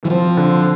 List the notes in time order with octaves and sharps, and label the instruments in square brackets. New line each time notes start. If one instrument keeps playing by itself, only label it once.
[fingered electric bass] E3
[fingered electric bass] F3 [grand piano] C4
[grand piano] D3